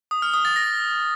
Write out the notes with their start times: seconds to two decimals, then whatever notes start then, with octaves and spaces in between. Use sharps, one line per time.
0.11 D#6
0.22 F6
0.34 D#6
0.45 A6
0.56 A#6